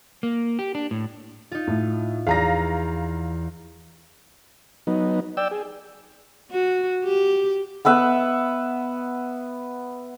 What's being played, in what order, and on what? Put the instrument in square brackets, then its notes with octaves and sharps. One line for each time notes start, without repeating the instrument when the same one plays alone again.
[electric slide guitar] A#3
G4
D4
A2
[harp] D#4 F4
[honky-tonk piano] A2
[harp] E2 [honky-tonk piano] F5 A#5 A#6
[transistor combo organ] F#3 B3 D#4
D5 G5 E6
G#4
[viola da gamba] F#4
G4
[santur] B3 B4 E5 F#5